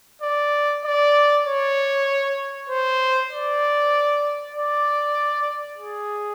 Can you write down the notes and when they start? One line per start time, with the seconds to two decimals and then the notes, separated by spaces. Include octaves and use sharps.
0.22 D5
0.85 D5
1.46 C#5
2.69 C5
3.32 D5
4.54 D5
5.78 G#4